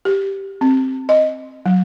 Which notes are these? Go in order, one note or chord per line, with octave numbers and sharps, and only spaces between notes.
G4
C4
D#5
F#3